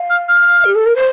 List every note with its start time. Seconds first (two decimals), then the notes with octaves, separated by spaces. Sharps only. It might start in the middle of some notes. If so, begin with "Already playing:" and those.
Already playing: F5
0.10 F6
0.29 F6
0.65 G4
0.75 A4
0.86 A#4
0.96 C5